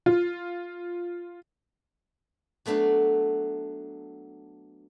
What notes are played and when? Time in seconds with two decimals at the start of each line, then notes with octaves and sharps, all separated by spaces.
0.06 F4
2.66 F#3 A3 B3 D4